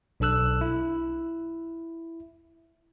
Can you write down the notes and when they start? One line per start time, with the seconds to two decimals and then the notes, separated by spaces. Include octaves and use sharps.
0.20 B1 D4 A4 E6 F#6
0.61 E4